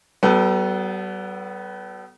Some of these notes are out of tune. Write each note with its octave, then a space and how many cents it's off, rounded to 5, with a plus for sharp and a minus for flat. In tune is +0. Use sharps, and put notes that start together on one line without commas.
G3 -45 B3 +0 A4 +0